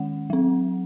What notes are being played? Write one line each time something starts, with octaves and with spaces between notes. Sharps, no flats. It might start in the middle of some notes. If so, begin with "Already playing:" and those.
Already playing: D#3 G#3 C#4 F#5
F#3 C4